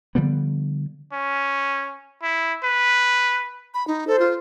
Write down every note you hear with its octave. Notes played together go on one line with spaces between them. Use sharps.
D3 F3 G3 B3
C#4
E4
B4
B5
D#4
A4 C5
F4